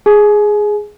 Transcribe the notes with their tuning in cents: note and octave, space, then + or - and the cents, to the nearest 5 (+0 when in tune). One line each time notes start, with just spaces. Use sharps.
G#4 +0 G#5 +35